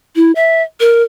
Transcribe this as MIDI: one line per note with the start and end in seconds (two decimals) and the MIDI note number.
0.16 0.32 64
0.35 0.62 76
0.80 1.03 70